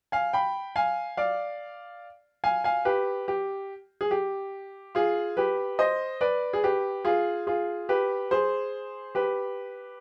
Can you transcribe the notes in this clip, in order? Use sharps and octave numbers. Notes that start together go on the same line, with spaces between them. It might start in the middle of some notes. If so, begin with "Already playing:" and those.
F5 G#5
G5 B5
F5 G#5
D5 F5
F5 G#5
F5 G#5
G4 B4
G4
G#4
G4
F4 G#4
G4 B4
C5 D#5
B4 D5
G#4
G4 B4
F4 G#4
F4 G#4
G4 B4
G#4 C5
G4 B4